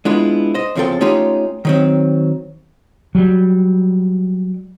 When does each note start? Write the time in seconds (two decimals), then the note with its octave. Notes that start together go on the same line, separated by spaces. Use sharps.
0.05 G#3 B3 D4 E4 F4
0.54 C5 D#5
0.75 E2 C#3 F3 C4 A4 G5
1.01 A3 C#4 D#4 F4 G4
1.65 D#3 F#3 C4
3.15 F#3 G3